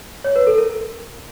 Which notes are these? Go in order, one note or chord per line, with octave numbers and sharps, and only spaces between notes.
C#5
B4
A4
A#4